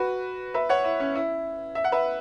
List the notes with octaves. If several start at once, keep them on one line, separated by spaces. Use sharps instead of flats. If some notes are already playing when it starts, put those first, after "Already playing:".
Already playing: F#4 B4
B4 E5
C#5 F#5
E4
C#4
E4
E5
F#5
B4 E5